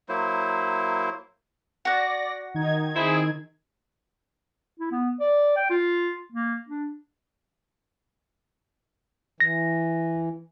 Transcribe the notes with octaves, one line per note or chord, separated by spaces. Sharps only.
F#3 A#3 E4 C5
F#4 D5 F#5 A#6
D#3 D#4 G#6
C4 E4 G#4
E4
B3
D5
G5
F4
A#3
D4
E3 A#6